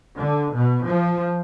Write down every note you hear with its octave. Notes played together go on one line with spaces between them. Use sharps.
D3
B2
F3